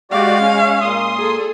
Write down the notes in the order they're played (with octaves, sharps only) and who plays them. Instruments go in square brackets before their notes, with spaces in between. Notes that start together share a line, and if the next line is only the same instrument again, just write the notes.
[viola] G#3 F5 [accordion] F#4 G4 D5
[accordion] C#4
A#2 C6 D#6
[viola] G#4 A4